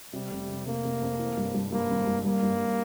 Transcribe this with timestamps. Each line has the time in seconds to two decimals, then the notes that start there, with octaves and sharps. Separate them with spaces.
0.13 C3 G3
0.31 F1
0.48 F1
0.66 F1 A#3
0.84 F1
1.01 F2
1.19 E3
1.37 G2
1.54 G2
1.72 G2 A#3
1.89 G#1
2.07 G2
2.24 G3 A#3
2.42 G2